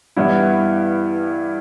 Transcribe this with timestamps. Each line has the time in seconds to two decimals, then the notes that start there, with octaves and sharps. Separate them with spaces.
0.16 G2 E3 G3 B3 E4